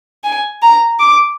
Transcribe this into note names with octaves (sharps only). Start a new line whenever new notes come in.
G#5
A#5
D6